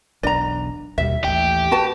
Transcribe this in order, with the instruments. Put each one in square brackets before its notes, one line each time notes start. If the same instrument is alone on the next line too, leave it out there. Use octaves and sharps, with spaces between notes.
[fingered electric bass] E1 B1 D4 [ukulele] D5 A#5
[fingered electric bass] D#2 B2 G3 [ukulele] E5
[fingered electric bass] A1 D#2 [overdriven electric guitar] G4
[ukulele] F#4 B4 A5